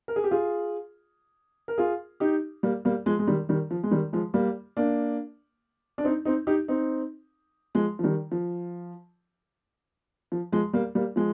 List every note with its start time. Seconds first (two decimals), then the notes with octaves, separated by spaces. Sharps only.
0.08 A#4
0.16 G#4
0.24 G4
0.31 F4 G#4
1.68 A#4
1.78 F4 G#4
2.20 D#4 G4
2.63 G3 A#3
2.85 G3 A#3
3.06 F3 G#3
3.19 G#3
3.27 D#3 G3
3.49 D#3 G3
3.71 F3
3.83 G#3
3.91 D#3 G3
4.13 F3 G#3
4.34 G3 A#3
4.77 A#3 D4
5.98 D4
6.04 C4 D#4
6.25 C4 D#4
6.47 D#4 G4
6.68 C4 D#4
7.75 F3 G#3
7.99 F3
8.04 D#3 G3
8.32 F3
10.32 F3
10.52 F3 G#3
10.73 G3 A#3
10.95 G3 A#3
11.16 F3 G#3